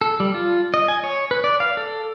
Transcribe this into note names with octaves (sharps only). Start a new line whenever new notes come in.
A4
G3
F4
D#5
G#5
C#5
B4
D5
F5
A4